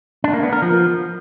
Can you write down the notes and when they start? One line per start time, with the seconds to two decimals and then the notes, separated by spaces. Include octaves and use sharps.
0.24 D4
0.34 A#3
0.43 B3
0.53 A#4
0.62 F3